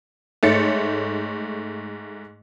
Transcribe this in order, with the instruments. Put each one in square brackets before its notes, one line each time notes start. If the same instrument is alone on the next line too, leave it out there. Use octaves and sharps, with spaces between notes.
[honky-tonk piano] G#2 A3 C#5 A6 C#7